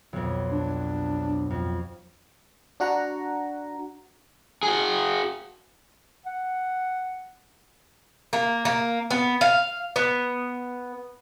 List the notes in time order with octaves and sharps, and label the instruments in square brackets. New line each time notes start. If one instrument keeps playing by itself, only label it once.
[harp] B1 F2
[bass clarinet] D4
[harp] F2
[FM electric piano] D4 F#4 F#5 A#5
[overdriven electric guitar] F#4 G#4
[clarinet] F#5
[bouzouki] A#3
A#3
B3
F5
B3